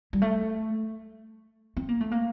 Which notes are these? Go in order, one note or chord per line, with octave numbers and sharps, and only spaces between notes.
G3
A3
C4
A#3
A3
A#3